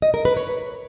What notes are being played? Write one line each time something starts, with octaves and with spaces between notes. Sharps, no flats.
D#5
A#4
B4
C#5